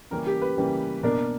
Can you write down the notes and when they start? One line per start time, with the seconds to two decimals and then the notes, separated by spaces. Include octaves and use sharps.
0.10 C#3 E3 G3 A#3 C#4 A#4
0.26 G4
0.42 B4
0.57 C#3 E3 G3 A#3 C#4
1.03 B2 A#3 D4 A#4